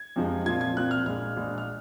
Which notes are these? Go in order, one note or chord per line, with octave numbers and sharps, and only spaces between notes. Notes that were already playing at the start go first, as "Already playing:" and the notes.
Already playing: G#6
F2 C3 F3 G#3
A#2 F3 C4 F4 G#6
G#6
A#2 F3 C4 F4 F#6
F6
A#1 A#2 G#3 F6
A#1 A#2 G#3
F6